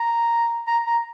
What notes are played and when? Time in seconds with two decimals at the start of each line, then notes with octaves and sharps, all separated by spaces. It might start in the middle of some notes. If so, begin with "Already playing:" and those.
Already playing: A#5
0.67 A#5
0.87 A#5